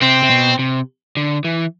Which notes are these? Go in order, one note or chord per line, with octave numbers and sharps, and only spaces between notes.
C3 C4
C3
B2
C3
D3
E3